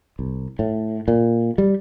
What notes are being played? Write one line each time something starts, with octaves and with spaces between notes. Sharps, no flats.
C2
A2
A#2
G3